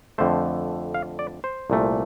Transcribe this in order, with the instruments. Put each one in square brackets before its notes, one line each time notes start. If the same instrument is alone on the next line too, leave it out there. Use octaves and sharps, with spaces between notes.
[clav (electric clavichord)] F2 D3 A3 C5
F5
D5
C5
C2 A#2 A3